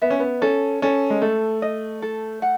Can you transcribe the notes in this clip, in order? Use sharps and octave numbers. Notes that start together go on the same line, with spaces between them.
B3 E5
C#4
B3
C#4 A4
C#4 A4
G#3
A3 A4
D#5
A4
F#5